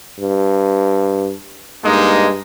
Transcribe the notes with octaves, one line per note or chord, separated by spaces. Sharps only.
G2
G2 G#3 A#3 D#4